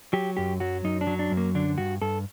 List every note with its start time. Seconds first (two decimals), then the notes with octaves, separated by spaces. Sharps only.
0.13 F#3 G4
0.37 F#2 G4
0.60 F#3 F#4
0.84 F#2 D#4
1.01 D4
1.07 F#3
1.19 D4
1.31 F#2
1.37 A#3
1.55 D3 D4
1.78 G2 F#4
2.01 G2 A4